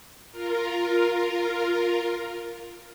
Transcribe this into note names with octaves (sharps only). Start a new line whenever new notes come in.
F4 A#4